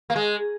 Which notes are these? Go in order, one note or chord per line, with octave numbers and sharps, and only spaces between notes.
A#3
G#3